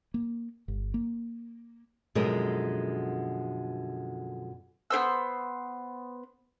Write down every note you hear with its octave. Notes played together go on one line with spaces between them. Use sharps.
A#3
G1
A#3
F#2 B2 D3 F3 G#3 A#4
B3 G4 C5 E6